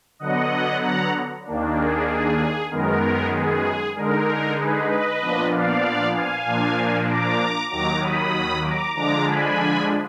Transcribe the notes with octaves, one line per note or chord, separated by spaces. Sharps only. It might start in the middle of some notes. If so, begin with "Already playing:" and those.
D3 F#3 B3 D#5 F#5
F#5 A#5
D#2 D#3 A#3 D4
G#4
G#4
F#2 D#3 G#3 B3 A#4
G#4
D3 G#3 D#4 A#4
G#4 B4
B4 D#5
A#2 F3 B3 D4
D5 F5
F5 G#5
A#2 F3 A#3 D4
A#5 D6
D#2 D#3 F#3 A#5 D6
B5 D#6
A#5 D6
D3 F3 G#3 D4 A#5 D6
G#5 B5